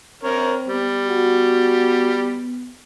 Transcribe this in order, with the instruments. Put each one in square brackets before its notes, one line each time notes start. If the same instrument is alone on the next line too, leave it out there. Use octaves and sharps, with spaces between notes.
[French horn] C4 [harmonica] A#4 C#5
[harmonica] G3 [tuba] B3
[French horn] F#4